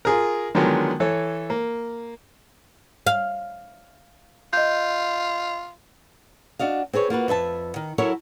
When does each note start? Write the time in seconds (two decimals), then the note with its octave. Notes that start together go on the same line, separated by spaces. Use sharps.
0.05 F4 G#4 A#4
0.55 D3 D#3 F3 F#3 G#3 B3
1.00 E3 A4 C#5
1.50 A#3
3.07 F5
4.53 F4 D#5 G6
6.59 D4 F#4 D#5 F5
6.93 C4 G#4 B4 C#5
7.10 A#3 F4 F#4 B4
7.28 F2 B4 E5 A5
7.76 D#3
7.98 F#3 E4 F#4 A4 A#4 C#5